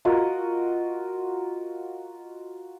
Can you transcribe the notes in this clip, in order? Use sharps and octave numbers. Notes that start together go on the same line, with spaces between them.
F4 F#4 A#4 D#5